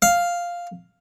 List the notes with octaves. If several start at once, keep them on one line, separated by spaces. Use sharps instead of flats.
F5